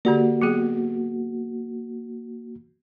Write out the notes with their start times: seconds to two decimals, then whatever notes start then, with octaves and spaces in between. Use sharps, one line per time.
0.05 D3 A#3 F#4 G4 D5
0.42 F#3 B3 G#4